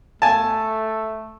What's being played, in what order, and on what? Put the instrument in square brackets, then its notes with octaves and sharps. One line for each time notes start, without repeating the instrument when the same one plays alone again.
[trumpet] A3 [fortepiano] G#5 A5